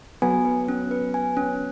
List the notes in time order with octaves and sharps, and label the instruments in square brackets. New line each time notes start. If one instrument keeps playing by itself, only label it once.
[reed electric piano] F#3 B3 [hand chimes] G#5
[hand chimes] B4
C#4
B4
G#5
C#4